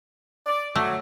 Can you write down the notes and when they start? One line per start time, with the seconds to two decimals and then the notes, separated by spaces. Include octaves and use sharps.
0.47 D5
0.76 F#3 A3